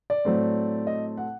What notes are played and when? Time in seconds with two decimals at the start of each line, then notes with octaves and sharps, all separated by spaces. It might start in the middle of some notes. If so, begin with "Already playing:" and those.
0.10 D5
0.25 A2 F#3 A3 C4
0.87 D#5
1.17 F#5